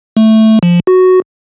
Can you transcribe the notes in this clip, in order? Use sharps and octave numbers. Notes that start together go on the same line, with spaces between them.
A3
F3
F#4